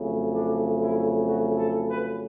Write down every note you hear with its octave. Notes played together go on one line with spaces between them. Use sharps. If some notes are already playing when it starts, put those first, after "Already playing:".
Already playing: F2 C#3 F#3 A3
D4
E4
F#4
A4
B4